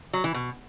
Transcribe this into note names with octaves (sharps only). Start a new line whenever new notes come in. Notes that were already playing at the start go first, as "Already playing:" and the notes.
F#3
E3
B2